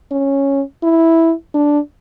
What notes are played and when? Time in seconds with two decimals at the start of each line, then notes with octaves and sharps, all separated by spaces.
0.11 C#4
0.83 E4
1.54 D4